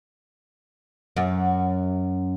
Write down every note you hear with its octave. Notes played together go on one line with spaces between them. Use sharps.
F#2